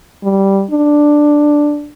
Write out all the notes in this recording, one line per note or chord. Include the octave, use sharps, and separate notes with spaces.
G3
D4